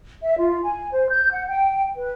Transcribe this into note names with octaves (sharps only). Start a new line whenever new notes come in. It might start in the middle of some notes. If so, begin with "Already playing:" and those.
E5
F4
G#5
C5
G6
F#5
G5
B4